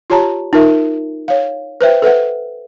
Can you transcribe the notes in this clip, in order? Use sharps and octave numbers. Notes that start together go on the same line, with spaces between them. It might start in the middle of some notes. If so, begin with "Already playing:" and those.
F4 G4 C#5 A5 A#5
D#4 F4 A#4 E5
C#5 F5
B4 C5 E5 G5
A4 B4 E5 F#5